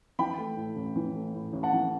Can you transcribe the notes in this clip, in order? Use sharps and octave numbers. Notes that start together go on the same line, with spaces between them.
E3 G5 B5
A3
A2
A1
E3
A3
A2
A1
F#5 A5
E3